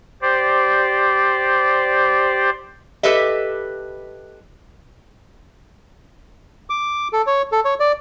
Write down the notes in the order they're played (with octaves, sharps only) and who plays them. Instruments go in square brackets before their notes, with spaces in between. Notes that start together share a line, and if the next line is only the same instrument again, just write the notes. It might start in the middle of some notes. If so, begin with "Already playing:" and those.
[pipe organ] G4 C5 D5
[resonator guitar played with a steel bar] G4 A4 B4 D#5 E5
[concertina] D6
A4
C#5
A4
C#5
D5